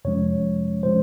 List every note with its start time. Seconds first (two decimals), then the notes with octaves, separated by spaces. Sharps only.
0.05 F2 C3 F3 G#3 C#4 C#5
0.83 C3 F3 G#3 C#4 C5